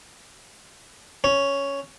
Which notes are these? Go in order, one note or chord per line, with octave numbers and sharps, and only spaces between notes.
C#4